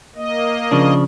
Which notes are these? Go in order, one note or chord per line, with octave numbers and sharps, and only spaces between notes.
A#3 D#5
C#3 F3 D4